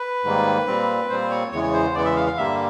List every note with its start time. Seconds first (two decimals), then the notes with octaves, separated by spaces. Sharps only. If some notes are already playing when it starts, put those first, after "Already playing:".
Already playing: B4
0.24 G#2 D#3 G3 A#3
0.67 A#2 G3 C4
1.09 A#2 G3 C4 C5
1.30 C#5
1.52 E2 C#3 E3 G#3 B3 C#5
1.63 C#5
1.73 C5
1.94 E2 C#3 E3 G#3 B3 D5
2.05 E5
2.16 F5
2.27 F5
2.37 G2 D3 G3 A#3 E5